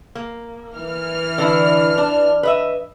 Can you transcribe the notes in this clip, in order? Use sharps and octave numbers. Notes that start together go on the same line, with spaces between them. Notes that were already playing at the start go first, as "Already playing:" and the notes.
A#3
E3 F6
D3 D4 E4
D4
B4 D#5 E5